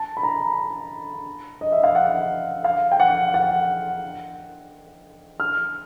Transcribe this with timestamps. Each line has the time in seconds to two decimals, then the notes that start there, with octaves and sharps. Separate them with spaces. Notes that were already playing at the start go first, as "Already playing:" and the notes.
Already playing: A5
0.17 B5
0.23 A#5
1.61 D#5
1.72 E5
1.84 F5
1.95 F#5
2.64 F5
2.92 G5
3.00 F#5
3.34 F#5
5.40 F6